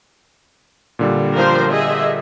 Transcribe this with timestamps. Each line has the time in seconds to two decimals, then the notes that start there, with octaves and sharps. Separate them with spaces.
0.99 A#2 D3 G3
1.35 F3 A#4 C5
1.73 G#4 D#5 E5